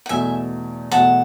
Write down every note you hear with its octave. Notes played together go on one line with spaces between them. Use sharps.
F#5
E2 B2 A3 E5 G#5
E2 B2 A3 F#5 A5